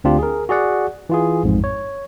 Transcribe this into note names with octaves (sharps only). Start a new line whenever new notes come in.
D2 C4 D4 F4 G4
G#4 A#4
F#4 G#4 D5 F#5
E3 F4 G#4
A1 F2 G#2
C#5